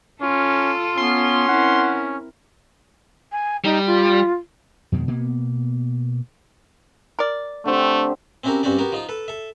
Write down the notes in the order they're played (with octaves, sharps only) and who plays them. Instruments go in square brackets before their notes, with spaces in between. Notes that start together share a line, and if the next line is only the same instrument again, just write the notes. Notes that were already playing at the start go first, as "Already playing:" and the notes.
[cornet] C#4 [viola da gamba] F4 A4
[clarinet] B3 [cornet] C#4 [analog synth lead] C6
[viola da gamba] C4 E4 A#4 [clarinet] F#5
[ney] G#5
[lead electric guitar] G3 [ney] D#4
[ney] F4
[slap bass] F2 B2 D#3 G#3
B2 A#3 B3
[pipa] A#4 D5
[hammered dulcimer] D3 C4 G4 [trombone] A3
[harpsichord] C4 C#4 E4 F#4 G4 A#4
G2 C4 C#4 F#4 G4 D5
B3 F#4 G4 A#4
F3 D#4 F4
A4 B4
A4 E5